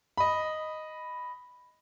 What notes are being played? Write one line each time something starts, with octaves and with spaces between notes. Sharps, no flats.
D#5 B5